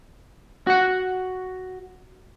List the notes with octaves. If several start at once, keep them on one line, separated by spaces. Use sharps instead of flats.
F#4 F#5